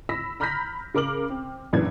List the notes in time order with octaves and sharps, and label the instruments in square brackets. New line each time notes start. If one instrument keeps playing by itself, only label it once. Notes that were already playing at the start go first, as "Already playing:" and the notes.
[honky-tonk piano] B5 E6 A#6 B6
A#5 B5 F6 G6 A#6 B6
C#3 A#4 D6 F6 F#7
C4
A#1 F#2 E3 D4 G#6